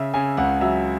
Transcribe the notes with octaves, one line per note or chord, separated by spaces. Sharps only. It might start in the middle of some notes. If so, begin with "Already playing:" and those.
Already playing: C#3 E5
C#3 G#5
C#2 F#5
F#3 E5